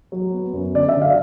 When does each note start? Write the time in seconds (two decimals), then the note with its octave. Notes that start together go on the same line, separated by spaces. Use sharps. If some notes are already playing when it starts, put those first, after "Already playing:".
0.12 F#3
0.33 B3
0.53 F#2
0.74 D3 D5
0.89 E5
0.95 D3
1.02 F5